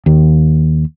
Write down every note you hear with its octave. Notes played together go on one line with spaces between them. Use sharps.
D#2